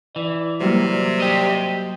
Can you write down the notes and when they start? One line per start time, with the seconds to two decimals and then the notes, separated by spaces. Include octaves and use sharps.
0.16 E3 D5
0.60 C3 F#3 G3 A#3
1.20 G4 D#5